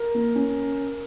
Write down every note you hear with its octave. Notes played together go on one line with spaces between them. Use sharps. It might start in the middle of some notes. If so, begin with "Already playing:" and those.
Already playing: A#4
A#3
C#4